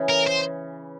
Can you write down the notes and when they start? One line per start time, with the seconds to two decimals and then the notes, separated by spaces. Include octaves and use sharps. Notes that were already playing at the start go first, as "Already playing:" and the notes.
Already playing: C#3 E3
0.09 A#4
0.27 C5